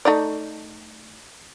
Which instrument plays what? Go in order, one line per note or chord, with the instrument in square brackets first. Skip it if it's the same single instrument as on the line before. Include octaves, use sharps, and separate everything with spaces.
[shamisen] A3 D#4 D5